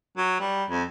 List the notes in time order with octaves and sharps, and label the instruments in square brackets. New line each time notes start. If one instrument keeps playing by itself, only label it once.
[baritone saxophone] F#3
G3
F2